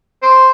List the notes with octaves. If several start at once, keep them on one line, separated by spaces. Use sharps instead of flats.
C5